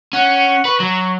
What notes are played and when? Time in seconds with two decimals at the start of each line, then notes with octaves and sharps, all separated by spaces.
0.13 C#4 F#5
0.65 B4 C#6
0.80 F#3